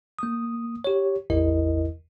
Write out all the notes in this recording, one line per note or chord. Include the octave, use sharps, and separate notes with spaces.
A#3 D#6
G4 C#5
A1 E2 E4 A#4 D#5